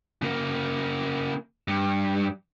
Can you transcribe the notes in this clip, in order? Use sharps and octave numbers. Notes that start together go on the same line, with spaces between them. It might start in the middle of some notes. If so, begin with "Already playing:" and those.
C#3 A#3
G2